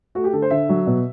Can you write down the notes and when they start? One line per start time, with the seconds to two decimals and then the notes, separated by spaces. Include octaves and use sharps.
0.15 A3 F#4
0.24 G4
0.33 D3 A4
0.42 C5
0.51 D3 E5
0.69 F#3
0.87 B2